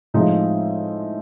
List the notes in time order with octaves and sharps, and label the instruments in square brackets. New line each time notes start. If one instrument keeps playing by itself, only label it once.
[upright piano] A2 F3 G#3 C4 D#4